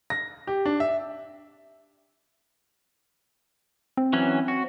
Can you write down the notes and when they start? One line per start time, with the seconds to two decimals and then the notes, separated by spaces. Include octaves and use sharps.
0.10 A#6
0.47 G4
0.66 D4
0.80 E5
3.97 C4
4.13 E3 F#3 C#4
4.48 F#4